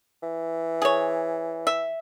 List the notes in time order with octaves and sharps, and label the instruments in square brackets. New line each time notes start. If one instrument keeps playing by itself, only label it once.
[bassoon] E3
[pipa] G#4 C#5
E5